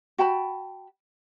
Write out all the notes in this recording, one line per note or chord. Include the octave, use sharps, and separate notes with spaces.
F#4 G5 A5 B5